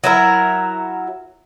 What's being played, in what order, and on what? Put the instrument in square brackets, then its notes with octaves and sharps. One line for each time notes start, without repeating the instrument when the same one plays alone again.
[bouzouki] F#3 E4 A#4